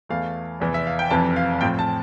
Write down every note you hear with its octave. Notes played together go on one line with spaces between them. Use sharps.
E2 E3 A3 F5
F1 E2 E3
E5
F5
G5
F1 F2 C3 E3 A5
F5
A2 F3 C4 G5
A5